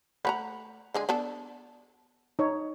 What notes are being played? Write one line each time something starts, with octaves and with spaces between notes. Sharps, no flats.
A3 C#5 F#5 A#5 B5
D3 G#3 G#4
B3 D4 A4
D#4 C#5